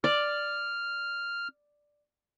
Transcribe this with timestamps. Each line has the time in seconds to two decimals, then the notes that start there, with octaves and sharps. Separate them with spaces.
0.04 D5 F6